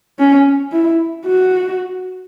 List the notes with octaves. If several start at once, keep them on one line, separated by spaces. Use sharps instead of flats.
C#4
E4
F#4